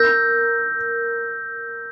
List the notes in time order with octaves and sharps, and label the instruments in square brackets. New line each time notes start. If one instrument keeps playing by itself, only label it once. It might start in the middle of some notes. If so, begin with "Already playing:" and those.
Already playing: [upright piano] A#4 [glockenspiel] E6 G6 A#6